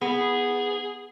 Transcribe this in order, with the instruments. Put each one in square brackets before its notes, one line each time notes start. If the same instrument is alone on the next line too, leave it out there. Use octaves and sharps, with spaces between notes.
[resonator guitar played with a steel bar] B3 [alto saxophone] G#4